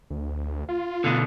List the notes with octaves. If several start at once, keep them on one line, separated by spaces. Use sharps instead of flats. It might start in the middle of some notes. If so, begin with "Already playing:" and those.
D2
F4
B2 D3